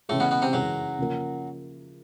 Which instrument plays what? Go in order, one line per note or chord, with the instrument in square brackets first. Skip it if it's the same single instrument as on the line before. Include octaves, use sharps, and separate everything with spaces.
[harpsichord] A2 A3 [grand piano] C#3 E3 G#3
[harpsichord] B2 B3
B2 B3
C3 C4
[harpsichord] F#2 F#3 [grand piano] C#3 E3 G#3
[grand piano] C#3 F3 A#3